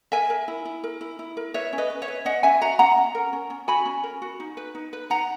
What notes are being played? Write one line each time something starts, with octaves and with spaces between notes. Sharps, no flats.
A#4 E5 G#5
A#4
E4
E4
A#4
E4
E4
A#4
B4 C#5 E5
C#4
B4 D#5
B4
C#5 E5
B4
C#4 D#5 F#5
C#4 E5 G#5
F#4 F#5 A#5
C#4 F#5 A#5
C#4
A#4
C#4
C#4
F#4 G#5 B5
C#4
A#4
F#4
D#4
B4
D#4
B4
D#4 F#5 A#5